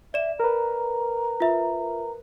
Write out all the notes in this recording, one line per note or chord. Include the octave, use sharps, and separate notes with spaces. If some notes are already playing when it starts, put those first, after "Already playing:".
D5 E5 E7
A#4 B4 A#5
F4 E5